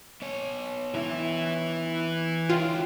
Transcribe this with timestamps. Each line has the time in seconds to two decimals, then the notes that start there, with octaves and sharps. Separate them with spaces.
0.22 B3 C#5
0.94 E3 E4
2.50 D3 F4 C#5 G5